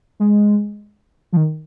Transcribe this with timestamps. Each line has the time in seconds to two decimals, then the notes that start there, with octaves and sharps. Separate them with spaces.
0.20 G#3
1.32 F3
1.37 D#3